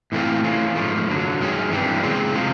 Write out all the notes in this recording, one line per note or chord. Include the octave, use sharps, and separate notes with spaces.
A2 E3 A3 C4 F4
E3 A3 C#4 F4
G#2 F3 A3
F#2 D3 F#3
F#2 D#3 G#3 C#4
G2 E3 G3 C4
E2 C#3 G#3 C4
C3 F3 G#3